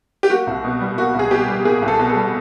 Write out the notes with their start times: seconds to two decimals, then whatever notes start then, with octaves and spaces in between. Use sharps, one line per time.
0.23 G4
0.30 A#3 F#4
0.47 C2
0.64 B2
0.80 G3
0.97 A#3 F#4
1.15 C2 G#4
1.31 B2 G4
1.48 G3
1.65 A#3 G#4
1.82 C2
1.88 A4
1.99 B2
2.10 A4
2.16 G3